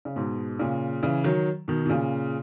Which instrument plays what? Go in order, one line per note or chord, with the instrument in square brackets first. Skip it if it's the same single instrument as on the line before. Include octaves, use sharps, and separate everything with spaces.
[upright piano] C#3
G#2 B2
A#2 C#3
C#3 E3
D#3 F#3
B2 D#3
B2
A#2 C#3